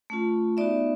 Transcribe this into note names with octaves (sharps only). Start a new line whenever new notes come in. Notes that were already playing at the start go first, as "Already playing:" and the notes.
A3 C#4 F4
B3 D#4 F#4 D5 E5